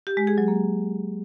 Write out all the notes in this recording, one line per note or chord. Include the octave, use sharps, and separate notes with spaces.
G4
G#3
G#4
F#3
A#3